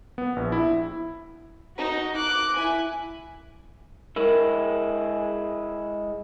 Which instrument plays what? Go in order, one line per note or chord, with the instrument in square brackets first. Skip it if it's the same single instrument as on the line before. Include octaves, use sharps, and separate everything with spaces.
[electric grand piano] B3
A#1
E4
[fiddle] D#4 F#4
D6 F#6
E4 G#5
[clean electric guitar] G#3 E4 [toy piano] A#4